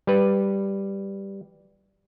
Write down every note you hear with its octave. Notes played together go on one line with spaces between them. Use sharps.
G3 B4